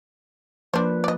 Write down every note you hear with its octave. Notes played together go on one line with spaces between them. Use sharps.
F3 A#3 D4 B4 C5
D5 D#5